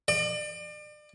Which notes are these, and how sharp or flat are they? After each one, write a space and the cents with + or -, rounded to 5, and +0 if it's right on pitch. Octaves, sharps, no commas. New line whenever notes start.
D5 +35